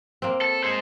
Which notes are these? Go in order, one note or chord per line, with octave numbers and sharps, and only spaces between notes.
A#3 C4
A4
G#3 C5